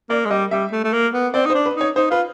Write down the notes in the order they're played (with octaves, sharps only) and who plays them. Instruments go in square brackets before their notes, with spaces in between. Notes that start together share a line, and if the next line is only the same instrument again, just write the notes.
[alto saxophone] A#3 [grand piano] D5
[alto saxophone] G#3
[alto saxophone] G3 [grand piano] D#5
[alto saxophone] G3 [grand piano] E5
[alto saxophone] A3
A3
A#3
B3
[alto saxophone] C4 [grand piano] D5
[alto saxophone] D#4
[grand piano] C5
[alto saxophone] D4
[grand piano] B4
[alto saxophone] D#4
[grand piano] C#5
[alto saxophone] D#4 [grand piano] C5
[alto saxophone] F4 [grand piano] B4